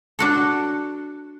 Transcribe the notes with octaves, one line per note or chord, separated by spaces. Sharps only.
D4 F#4 A4